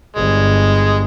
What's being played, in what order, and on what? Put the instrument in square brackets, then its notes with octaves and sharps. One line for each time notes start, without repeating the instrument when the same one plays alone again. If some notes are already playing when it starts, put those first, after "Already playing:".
[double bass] G1 [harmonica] G#3